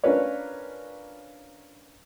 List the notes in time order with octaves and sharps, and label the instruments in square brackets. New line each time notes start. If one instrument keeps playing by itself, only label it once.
[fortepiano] C#4 D4 F4 A#4 B4 C#5